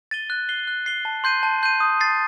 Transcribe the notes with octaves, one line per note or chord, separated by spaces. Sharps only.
A6 D#7 G7
F#6
C7 G7
F#6
C7 G7
A5
C6 G6 C7 D#7
A5
C6 G6 C7 D#7
D#6
A6 C7